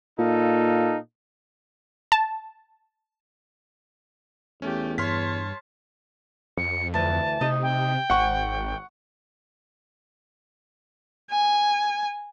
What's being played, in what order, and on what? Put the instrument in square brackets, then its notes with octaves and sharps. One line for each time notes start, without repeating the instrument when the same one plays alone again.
[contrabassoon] A#2 [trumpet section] D#4 A4 F5
[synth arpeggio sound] A5
[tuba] E2 [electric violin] A3 G4 [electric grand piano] C#4
[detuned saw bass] G2 [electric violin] C#5 A5 [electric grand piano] C6 F6 B6
[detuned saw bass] F2 [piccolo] C#7
[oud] D2 E3 [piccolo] A5
[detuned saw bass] C3 [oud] D#4 D#5
[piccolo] G5
[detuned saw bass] G#1 [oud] G#2 [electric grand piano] F#5 C#6
[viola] G#5